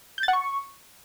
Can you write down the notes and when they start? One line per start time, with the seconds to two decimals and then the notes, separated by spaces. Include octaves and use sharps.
0.18 G6
0.23 A6
0.28 F#5
0.33 C#6